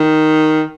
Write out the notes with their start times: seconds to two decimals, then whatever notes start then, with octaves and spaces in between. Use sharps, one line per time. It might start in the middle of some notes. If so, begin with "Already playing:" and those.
Already playing: D#3